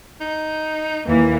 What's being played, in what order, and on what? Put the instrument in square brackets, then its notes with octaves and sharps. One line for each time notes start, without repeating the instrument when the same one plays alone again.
[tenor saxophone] D#4
[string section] D#2 E3 A#3